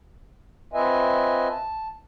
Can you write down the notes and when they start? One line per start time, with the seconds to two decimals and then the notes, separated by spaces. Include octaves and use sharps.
0.73 C4 F4 B4 D#5 E5 G#5
1.49 A5